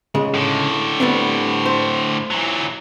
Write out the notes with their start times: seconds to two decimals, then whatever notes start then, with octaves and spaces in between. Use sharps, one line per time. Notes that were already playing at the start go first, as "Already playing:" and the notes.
0.15 C#2 C#3 G#3
0.34 A2 D3
1.00 G3 B3 C4
1.66 C5
2.31 E3 F#3